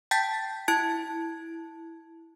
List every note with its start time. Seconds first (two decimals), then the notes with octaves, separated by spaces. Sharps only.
0.11 G5 A5 G6 A6 B6
0.68 E4 A5 G#6 D7